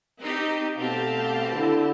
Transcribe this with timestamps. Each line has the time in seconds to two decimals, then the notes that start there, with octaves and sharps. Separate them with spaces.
0.20 C4 D#4 G4
0.78 B2 A3 B3 C4 G4 F5 A5
1.54 D3 E4